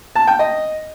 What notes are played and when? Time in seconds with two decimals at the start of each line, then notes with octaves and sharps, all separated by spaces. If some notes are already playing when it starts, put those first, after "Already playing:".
0.16 A5
0.27 G5
0.39 D#5